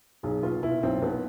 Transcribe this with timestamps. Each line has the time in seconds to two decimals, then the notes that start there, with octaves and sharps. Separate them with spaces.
0.23 B1 G#4
0.43 B2 F4
0.63 B2 E4
0.83 B1 C4
1.02 B1 B3